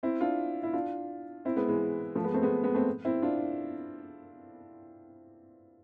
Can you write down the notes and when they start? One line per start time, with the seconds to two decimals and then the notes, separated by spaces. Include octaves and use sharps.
0.03 C4 E4
0.21 D4 F4
0.63 E4
0.73 D4 F4
1.45 C4 E4
1.56 G#3 B3
1.68 E3 G#3
2.15 F3 A3
2.24 G#3 B3
2.34 A3 C4
2.42 G#3 B3
2.63 G#3 B3
2.74 A3 C4
3.05 C4 E4
3.22 D4 F4